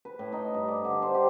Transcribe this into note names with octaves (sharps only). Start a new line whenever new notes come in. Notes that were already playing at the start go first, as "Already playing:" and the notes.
B4
A2
D#4
G2
D5
D3
C5
G4